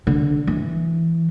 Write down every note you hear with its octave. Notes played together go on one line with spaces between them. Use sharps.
D3
E3